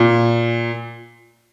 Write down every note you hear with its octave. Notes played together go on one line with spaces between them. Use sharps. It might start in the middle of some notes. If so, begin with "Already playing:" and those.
Already playing: A#2